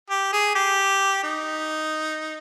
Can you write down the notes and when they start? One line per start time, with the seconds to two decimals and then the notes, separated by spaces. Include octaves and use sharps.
0.10 G4
0.33 G#4
0.55 G4
1.23 D#4